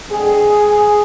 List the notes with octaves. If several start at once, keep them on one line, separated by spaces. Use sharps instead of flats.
D3 G#3 C4 G#4